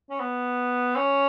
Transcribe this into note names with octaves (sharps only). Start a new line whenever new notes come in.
C#4
B3
C#4